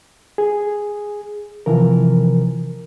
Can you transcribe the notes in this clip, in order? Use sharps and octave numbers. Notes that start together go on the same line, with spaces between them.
G#4
C3 E3 F3 A#4